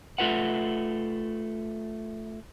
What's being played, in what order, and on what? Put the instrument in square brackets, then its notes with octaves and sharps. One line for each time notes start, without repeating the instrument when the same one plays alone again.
[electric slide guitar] A3 F4 B4 F#5